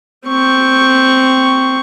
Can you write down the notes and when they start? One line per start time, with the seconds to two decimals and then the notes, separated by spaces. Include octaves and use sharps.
0.27 C4 C#6